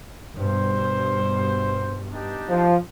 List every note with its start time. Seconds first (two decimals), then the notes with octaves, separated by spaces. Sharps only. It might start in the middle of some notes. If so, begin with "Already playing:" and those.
0.37 G2 B2 C5
2.13 D4 D#4 G4
2.50 F3